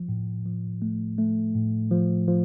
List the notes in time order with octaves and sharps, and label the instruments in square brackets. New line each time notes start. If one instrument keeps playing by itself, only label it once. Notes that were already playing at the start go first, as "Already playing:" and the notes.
Already playing: [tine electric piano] F3
A2
F3
A3
A3
A2
F3
F3